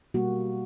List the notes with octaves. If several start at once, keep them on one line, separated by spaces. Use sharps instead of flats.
B2 G3 A#3 F#4